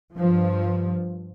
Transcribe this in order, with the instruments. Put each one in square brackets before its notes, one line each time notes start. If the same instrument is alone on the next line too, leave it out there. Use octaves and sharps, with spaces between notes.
[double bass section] G2 F3